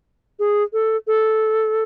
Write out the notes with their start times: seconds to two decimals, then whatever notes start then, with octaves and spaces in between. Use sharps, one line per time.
0.39 G#4
0.73 A4
1.07 A4